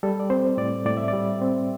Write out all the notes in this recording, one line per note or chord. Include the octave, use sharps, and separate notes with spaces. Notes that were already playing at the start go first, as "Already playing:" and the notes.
G3 A4
D5
C4 C5
A2 D5
A2 D5
E5
D5
G3
C4